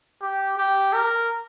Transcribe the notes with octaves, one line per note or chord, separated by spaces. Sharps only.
G4
G4
A#4